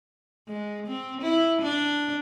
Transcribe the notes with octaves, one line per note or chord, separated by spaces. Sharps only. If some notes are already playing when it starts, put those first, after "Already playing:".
G#3
C4
E4
D4